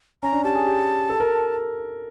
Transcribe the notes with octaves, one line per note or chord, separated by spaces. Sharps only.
C#4 A#5
D4
G4 A5
G#4
G4
A4
A#4